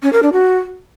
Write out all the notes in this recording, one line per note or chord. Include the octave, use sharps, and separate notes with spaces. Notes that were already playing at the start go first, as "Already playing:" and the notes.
C#4
A#4
D4
F#4